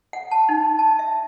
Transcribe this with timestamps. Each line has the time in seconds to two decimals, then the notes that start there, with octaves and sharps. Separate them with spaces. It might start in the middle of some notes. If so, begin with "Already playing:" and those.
0.13 F#5
0.31 A5
0.49 D#4
0.79 A5
0.99 E5